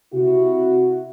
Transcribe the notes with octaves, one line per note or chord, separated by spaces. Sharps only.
C3 E4 F#4